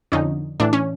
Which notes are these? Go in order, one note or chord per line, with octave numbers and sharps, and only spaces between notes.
F2 D3 C#4 D#4
A2 E3 D4
C#4